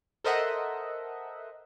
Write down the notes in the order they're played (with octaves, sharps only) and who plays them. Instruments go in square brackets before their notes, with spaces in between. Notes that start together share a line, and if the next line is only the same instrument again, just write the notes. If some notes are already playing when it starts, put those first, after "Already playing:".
[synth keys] A4 A#4 C5 D#5 E5 F#5